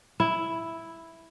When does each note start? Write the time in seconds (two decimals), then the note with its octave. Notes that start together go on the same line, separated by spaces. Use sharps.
0.20 E4